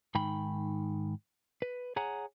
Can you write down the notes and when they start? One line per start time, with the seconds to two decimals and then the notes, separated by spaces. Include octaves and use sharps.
0.15 G#2 D#3 G5 B5
1.62 B4
1.96 G#4 C#5 F#5 G#5 A#5